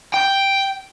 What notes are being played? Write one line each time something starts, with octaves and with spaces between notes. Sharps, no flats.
G5